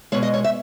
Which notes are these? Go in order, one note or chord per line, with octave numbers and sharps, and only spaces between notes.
B2 G#3 C#5
D#5
C#5
E5